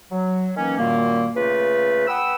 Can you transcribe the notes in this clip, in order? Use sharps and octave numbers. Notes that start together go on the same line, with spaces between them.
F#3
D#3 E3 A#3 C#4
F#2 A#2 D#3 G3 A#3
C#3 A3 F4 B4
B4 F#5 G5 D#6 E6